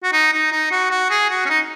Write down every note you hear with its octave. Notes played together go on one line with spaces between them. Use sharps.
F#4
D#4
D#4
D#4
F#4
F#4
G#4
F#4
C#4
D#4